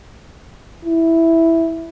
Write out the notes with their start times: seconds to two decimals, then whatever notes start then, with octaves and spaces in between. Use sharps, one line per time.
0.85 E4